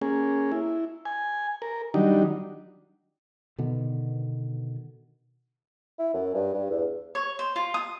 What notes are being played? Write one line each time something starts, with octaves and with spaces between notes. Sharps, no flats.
A#3 C#4 G#4
E4
G#5
A#4
D#3 F#3 G3 D4 D#4
B2 D3 D#3 B3
E4
F#2
G2
G2
E2
C#5
C5
F4
D#6